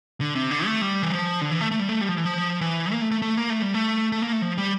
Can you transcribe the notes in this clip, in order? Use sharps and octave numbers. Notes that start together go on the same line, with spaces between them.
D3
C3
D3
A3
G3
E3
F3
D3
E3
A3
A3
G3
A3
G3
F3
E3
F3
E3
A#3
A3
A3
A3
A#3
A3
G3
A3
A3
A#3
A3
F3
G3